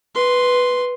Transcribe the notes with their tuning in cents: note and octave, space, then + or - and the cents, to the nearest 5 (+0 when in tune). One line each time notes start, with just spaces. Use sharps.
B4 +0 C6 +0